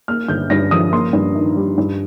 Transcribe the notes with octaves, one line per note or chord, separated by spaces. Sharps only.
A#3 F6
G1 G6
G2 A#6
F3 D#6
A#3 C6
G2
D#3
G3
G2